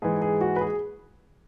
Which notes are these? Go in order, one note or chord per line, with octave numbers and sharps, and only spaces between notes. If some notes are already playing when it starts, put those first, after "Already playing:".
G#2 E3 G#4
G#4
F#4
B4
G#4